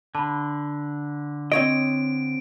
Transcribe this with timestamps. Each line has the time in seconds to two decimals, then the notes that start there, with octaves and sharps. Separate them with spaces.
0.15 D3 A5 B5
1.52 C4 C#5 D#5 D7